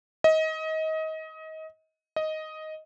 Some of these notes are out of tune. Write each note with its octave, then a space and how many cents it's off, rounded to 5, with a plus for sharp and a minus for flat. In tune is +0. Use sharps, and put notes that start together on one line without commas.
D#5 +25
D#5 +5